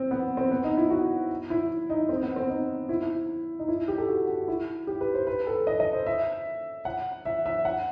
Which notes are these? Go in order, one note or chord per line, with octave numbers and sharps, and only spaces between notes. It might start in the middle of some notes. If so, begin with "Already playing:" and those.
Already playing: C4
B3
C4
B3
D#4
E4
F#4
E4
D#4
C4
B3
C4
D#4
E4
E4
D#4
E4
D#4
G4
A4
F#4
F#4
E4
G4
B4
C5
B4
A4
D#5
D#5
C5
E5
F#5
E5
E5
F#5